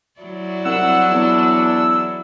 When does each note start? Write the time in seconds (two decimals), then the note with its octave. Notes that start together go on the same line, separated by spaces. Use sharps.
0.21 F#3 E4 D5
0.65 C2 F#5 E6
1.11 E2 D4